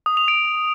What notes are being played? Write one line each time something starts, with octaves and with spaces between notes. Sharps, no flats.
D#6
F7
D7